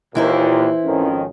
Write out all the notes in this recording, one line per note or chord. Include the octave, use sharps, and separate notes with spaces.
D#2 A#2 E3 E4 C5
G#1 F2 D#3 F3 C#4